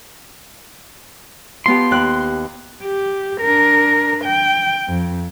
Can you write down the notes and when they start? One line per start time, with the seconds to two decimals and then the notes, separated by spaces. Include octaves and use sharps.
1.66 F3 B3 G4 C6
1.91 D#2 F#6
2.83 G4
3.41 D4 A#4
4.25 G5
4.89 F2